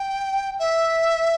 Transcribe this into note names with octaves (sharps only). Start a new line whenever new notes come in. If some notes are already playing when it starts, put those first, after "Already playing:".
Already playing: G5
E5